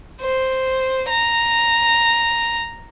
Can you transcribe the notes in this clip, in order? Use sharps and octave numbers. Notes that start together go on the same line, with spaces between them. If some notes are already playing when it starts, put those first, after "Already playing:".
C5
A#5